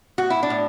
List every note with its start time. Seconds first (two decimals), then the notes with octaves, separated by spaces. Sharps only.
0.18 A2 F#4
0.30 E4
0.43 D4
0.50 A2